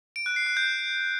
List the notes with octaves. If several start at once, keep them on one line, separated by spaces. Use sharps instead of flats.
D7
F#6
C7
F#6
G6